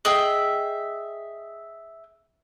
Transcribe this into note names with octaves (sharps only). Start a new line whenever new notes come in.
G#4 D#5 E5 G5